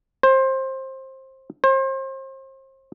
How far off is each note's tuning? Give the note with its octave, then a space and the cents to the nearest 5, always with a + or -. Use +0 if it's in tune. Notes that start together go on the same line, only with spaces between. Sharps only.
C5 +20
C5 +35